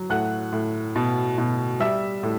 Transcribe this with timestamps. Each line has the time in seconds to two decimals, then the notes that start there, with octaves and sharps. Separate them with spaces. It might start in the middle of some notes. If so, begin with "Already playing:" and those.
Already playing: F#3
0.10 A2 F#5 F#6
0.52 A2
0.96 B2
1.38 B2
1.80 G3 E5 E6
2.23 A2